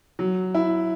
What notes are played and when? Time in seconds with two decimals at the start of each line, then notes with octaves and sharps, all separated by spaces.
0.19 F#3
0.55 E4